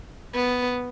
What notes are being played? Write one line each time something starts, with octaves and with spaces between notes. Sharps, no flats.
B3